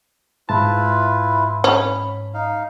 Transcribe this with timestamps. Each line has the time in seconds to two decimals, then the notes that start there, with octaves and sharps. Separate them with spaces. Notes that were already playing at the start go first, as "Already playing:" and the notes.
0.49 G#2 E4 F4 B4 A5
1.64 C#4 B5
2.34 D#4 F5